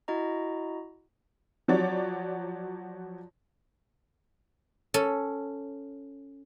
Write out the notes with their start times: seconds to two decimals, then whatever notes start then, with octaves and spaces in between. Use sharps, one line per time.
0.08 E4 F#4 D#5 A#5
1.68 F3 F#3 F#4 C#5 D5
4.94 C#4 A4